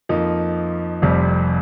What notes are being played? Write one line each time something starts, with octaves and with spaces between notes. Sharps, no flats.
F2 F3 A#3 D#4
F1 F2 C3 G3